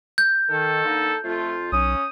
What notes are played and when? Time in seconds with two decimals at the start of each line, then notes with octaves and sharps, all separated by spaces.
0.18 G6
0.50 D#3 A4
0.85 D3 A#3 D#4
1.24 F2 A3 F4
1.72 B1 C#4 D#6